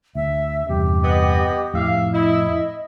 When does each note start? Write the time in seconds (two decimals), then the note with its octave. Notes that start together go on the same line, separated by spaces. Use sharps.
0.15 D2 E5
0.68 E2 G2 C3 G4
1.02 B3 D#5
1.74 F2 A2 E5 F5
2.13 E4 D#5